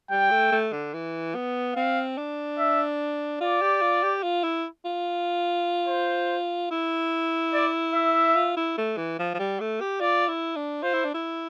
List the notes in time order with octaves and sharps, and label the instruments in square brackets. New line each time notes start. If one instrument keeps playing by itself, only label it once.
[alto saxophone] G3 [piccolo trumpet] G5
[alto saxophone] A3
A3
D3
E3
B3
[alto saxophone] C4 [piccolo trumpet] F5
[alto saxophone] D4
[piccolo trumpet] E5
[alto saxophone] F4 [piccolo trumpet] D5
[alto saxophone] G4
F4
G4
F4
E4
F4
[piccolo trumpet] C5
[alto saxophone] E4
[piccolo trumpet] D5
E5
[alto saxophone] F4
E4
A3
E3
F3
F3
G3
A3
G4
[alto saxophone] F4 [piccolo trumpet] D5
[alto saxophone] E4
D4
[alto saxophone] F4 [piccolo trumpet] C5
[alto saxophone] E4
D4
E4